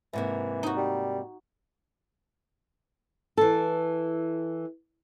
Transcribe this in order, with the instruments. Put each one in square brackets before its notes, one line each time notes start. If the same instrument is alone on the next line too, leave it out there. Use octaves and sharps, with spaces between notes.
[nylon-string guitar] G#2 C3 A#3 [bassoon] E3
[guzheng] D#4 F#4
[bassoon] G3
[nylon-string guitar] E3 A4